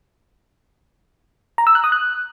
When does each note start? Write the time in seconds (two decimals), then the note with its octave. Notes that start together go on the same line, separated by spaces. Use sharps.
1.58 A#5
1.67 E6
1.75 F#6
1.84 D#6
1.92 F#6